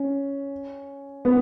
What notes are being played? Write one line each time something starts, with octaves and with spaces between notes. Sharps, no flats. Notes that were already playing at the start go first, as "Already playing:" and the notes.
Already playing: C#4
B3